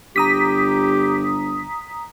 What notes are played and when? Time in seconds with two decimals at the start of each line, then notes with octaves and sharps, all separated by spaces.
0.16 G1 G4 A#5 D#6 B6